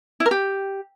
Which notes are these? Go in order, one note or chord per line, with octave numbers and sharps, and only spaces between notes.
E4
A#4
G4